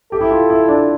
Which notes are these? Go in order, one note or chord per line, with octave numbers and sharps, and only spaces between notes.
G4 A4
E4
F4
E4
D4